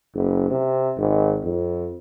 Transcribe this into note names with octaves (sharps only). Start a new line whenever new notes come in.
F#1
C3
G#1
F2